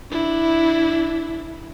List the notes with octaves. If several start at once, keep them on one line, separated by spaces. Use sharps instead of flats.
D4 E4